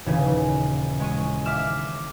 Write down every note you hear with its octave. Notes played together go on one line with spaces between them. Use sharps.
D#1 C#3 E3 G#4
G#3 C#6 D#7
E5 D6 F6 E7